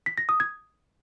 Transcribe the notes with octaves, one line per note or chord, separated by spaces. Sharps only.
B6
A#6
D#6
G#6